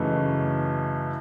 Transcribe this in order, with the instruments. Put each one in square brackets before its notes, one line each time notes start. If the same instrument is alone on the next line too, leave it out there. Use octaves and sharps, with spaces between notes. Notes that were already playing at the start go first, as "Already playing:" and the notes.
Already playing: [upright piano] F#2 C#3 E3 A3 D#4